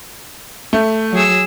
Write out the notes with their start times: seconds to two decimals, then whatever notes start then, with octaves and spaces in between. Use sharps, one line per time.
0.73 A3
1.12 F#3 G#4 E6